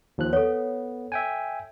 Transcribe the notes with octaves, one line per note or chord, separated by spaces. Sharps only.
D#2 F3 F#6
B3 A4 C#5
E5 G5 G#5